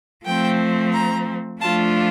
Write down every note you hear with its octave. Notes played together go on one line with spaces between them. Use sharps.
F3 A3 C4 G5
A#5
F3 A3 D4 F4 A5